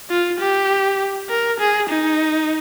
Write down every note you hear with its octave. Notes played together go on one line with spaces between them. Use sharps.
F4
G4
A#4
G#4
D#4